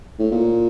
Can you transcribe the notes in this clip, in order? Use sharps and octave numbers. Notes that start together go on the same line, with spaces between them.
A2
A#2